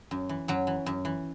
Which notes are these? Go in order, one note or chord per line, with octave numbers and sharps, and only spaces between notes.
F#2
E3
F#2 F#3
E3
F#2
E3